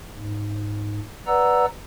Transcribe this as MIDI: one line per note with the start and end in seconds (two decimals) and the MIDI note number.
0.15 1.00 44
1.27 1.66 71
1.27 1.66 74
1.27 1.66 78
1.27 1.66 82
1.27 1.66 88